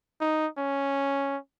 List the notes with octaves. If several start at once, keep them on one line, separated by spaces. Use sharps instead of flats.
D#4
C#4